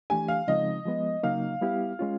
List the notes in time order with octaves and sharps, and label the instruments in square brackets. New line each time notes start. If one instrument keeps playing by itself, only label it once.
[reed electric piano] E3 A3 D4 G4 [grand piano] G#5
[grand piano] F5
[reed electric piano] C#3 F3 G#3 C4 D#4 [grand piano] D#5
[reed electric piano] F3 G#3 B3
[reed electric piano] C#3 F#3 A#3 D#4 [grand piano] F5
[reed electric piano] G3 B3 E4 G4
G#3 C#4 F4